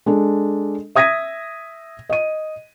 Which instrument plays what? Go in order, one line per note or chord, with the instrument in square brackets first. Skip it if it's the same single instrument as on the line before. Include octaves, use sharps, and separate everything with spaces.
[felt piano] G#3 D4 A4
E5 D#6 G#6 A#6 B6 D#7
D#5 D#7